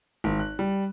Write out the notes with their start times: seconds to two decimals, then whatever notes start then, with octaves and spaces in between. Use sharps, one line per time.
0.24 G#1
0.39 F#6
0.59 G3